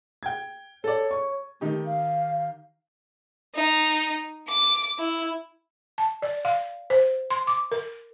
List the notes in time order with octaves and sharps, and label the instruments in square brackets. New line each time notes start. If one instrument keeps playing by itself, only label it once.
[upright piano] G5 G#6
[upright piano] A4 D5 [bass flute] C#5
[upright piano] C#6
[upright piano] D#3 D#4 G4 [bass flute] A3
[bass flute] F5
[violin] D#4
D6
E4
[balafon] A5
D5
F5
C5
C6
D6
A#4